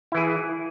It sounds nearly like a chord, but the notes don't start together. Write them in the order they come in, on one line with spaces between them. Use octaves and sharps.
E4 E3 G#4